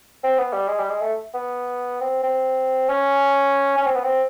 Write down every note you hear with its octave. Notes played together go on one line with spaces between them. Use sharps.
C4
B3
G3
G#3
G3
G#3
A3
B3
C4
C4
C#4
C#4
C4
B3
C4